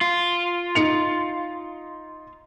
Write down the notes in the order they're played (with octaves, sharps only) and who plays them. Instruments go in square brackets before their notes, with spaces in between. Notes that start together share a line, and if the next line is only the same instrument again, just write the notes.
[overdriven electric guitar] F4
[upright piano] D#4 C#7 F7